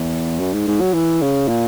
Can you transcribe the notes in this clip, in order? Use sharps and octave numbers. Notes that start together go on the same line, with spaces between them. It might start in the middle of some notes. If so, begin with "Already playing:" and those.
Already playing: E2
F#2
G#2
G#2
F#3
E3
C#3
A#2